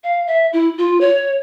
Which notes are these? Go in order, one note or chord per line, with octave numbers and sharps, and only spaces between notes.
F5
E5
E4
F4
C#5